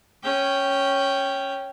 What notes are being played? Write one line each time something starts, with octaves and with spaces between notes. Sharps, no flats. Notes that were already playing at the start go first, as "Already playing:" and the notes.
C#4 G5